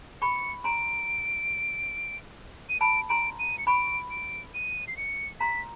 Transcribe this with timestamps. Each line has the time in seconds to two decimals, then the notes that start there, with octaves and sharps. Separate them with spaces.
0.22 B5 C#6 C#7
0.64 A#5 C6 D7
2.69 D#7
2.80 A5 B5 D7
3.09 A#5 C6 D7
3.39 D#7
3.58 C#7
3.67 B5 C#6 D7
4.10 D7
4.54 D#7
4.88 C7
4.97 C#7
5.40 A#5 C6 B6